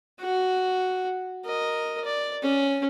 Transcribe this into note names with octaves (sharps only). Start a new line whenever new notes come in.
F#4
A#4 D#5
D5
C#4